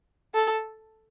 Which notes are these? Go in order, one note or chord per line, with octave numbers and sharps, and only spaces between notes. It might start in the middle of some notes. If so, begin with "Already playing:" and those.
A4